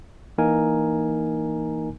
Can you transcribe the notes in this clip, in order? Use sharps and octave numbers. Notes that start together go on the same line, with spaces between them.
E3 A#3 D#4 A#4 G#5